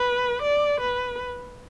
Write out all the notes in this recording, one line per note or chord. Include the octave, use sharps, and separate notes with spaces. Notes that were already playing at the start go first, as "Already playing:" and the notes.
Already playing: B4
D5
B4